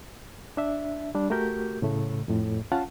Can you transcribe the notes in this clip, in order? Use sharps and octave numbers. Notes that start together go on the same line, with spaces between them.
D4 E5
G3 D4
A3 F#4 G4 A#4 G6
A2 C#3 A3
F2 A2
C#4 F4 F5 F#5 A5